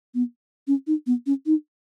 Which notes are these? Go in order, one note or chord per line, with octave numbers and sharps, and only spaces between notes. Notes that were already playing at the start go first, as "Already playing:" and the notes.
B3
C#4
D#4
B3
C#4
D#4